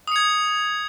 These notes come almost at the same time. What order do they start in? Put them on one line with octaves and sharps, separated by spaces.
D#6 C#7 G#6